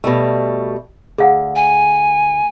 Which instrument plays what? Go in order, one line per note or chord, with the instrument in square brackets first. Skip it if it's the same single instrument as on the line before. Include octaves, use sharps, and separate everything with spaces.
[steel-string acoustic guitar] B2 G3 A3
[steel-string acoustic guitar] D2 [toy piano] G#4 F5 F#5
[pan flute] G#5